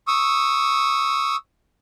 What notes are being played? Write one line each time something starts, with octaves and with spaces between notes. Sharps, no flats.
C#6 D#6 E6